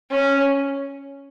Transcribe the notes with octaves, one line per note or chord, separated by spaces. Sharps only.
C#4